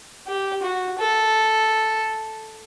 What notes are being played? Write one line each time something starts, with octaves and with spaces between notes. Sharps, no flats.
G4
F#4
A4